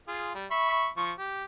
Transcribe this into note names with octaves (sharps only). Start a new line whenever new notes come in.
F4 G#4
G3
E5 B5 C#6
F3 C#6
G4